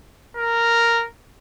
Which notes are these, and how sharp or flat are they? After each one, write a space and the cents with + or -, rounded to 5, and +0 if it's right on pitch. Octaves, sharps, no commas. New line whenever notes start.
A#4 -5